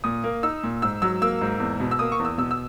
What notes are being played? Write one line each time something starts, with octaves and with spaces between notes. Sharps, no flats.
A#2 D#6
A#3
D#4 E6
A#2
G#2 E6
F#3 E6
A#3 E6
G#2
E2
B2
E6
A#3 D#6
C#6
E2
E6
B2 E6
E6